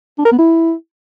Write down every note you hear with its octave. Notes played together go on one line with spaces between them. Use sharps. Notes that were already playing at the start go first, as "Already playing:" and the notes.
D4
A#4
B3
E4